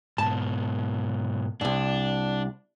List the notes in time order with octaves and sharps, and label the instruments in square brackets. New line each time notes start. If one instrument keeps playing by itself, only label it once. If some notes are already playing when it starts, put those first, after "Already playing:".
[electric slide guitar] G#2 B2 [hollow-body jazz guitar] A5
[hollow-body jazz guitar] C2 G#2 [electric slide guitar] D4